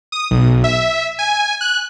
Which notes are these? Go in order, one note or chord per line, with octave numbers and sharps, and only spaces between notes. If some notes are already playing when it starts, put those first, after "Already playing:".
D#6
B1
E5
G#5
F#6